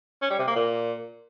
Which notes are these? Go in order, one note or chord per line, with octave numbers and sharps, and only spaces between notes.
C#4
G3
C3
A#3
A#2